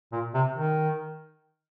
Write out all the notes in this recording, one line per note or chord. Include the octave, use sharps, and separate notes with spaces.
A#2
C3
D#3